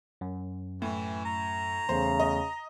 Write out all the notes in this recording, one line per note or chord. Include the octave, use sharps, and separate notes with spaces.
F#2
A2 E3
A#5
E2 C#3 A3 C5
D#5